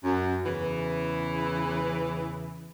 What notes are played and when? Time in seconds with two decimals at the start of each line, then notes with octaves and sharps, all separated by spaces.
0.04 F#2
0.45 E2 C#3 E3